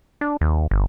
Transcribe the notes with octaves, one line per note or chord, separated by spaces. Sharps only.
D4
D#2
G1